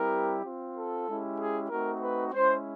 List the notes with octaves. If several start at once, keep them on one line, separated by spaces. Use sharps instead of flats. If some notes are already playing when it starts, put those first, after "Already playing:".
Already playing: G3 C4 E4 G4 A#4
C4 F4
A4
G#3 C#4 E4 G4
G#4
A3 C4 D#4 F#4 A#4
B4
G#3 C#4 E4 C5